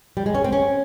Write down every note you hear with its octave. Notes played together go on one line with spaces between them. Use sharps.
G3
G#3
C#4
C4
C#4